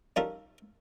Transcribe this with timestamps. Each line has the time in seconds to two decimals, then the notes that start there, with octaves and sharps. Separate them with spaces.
0.16 D#3 G3 C#4 F4 A4 A#4